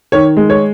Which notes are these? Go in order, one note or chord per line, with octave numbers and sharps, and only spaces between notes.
D#3 C#5
G#3
C#5